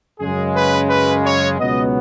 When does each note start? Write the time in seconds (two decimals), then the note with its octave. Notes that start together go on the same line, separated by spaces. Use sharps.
0.19 F#2 C#3 G#3 G#4
0.55 B4
0.89 B4
1.25 C#5
1.59 C#2 B2 F#3 B3 D#5